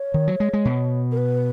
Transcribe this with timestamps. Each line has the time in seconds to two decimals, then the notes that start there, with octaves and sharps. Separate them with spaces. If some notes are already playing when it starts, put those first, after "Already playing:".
Already playing: C#5
0.14 D#3
0.28 F#3
0.40 G#3
0.53 G#3
0.65 B2
1.12 A#4
1.18 B4